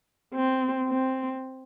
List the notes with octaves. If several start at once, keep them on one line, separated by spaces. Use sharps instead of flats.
C4
C4